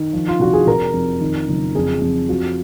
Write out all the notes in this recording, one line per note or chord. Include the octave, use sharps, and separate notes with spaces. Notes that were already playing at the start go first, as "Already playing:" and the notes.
Already playing: D#3
F3
F4
F1 F#4
G#4
F1 A#4
F2
D#3
F#1
F2 G#4
F2
F3 F#4